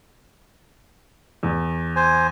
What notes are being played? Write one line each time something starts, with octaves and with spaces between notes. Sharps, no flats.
E2
C5 G#5